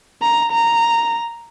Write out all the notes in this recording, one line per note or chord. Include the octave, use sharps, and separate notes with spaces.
A#5
A#5